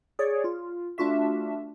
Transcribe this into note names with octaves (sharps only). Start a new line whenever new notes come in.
G#4 C#5 D5
F4
A3 D4 F4 F#4 E5